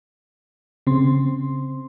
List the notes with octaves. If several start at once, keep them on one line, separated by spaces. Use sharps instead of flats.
C#3 C4 C6